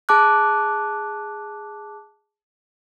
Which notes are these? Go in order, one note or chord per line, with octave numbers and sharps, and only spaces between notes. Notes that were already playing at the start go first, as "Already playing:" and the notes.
G#4 A5 D6 F#6